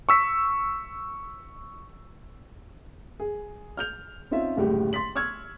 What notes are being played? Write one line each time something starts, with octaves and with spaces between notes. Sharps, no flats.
C#6 E6 B6
G#4
F6 G6 F7
C4 C#4 D#4 F4 E5
F#1 D2 A2 G3 G4
C6 A6 B6 F#7
C#6 E6 F6 G#6